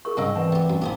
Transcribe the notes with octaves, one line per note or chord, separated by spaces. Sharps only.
G#4 A#4 C#6
C2 G#2 C#3 D#5 G5 C#6 E6
E3 C4 D5 F#5 A5
A3 G4
F#2 F#4
A#2 A#3 D#4 E4 G4 G#4 C5